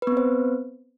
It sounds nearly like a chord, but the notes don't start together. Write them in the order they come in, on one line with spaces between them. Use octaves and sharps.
B4 B3 C4 C5